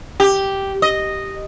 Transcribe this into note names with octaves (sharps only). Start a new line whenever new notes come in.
G4
D#5